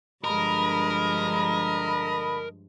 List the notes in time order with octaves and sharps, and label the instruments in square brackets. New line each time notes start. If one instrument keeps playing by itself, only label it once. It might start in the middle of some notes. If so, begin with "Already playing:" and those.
[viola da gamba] G2 F3 G#3 [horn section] D3 A5 B5 [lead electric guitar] A#4 [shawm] D#5